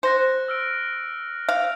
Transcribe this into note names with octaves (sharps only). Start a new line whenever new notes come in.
C5 F#6 A#6 C#7
E6 F6 D7
F5